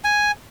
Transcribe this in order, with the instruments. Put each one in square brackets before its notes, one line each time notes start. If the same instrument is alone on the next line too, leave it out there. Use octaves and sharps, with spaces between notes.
[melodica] G#5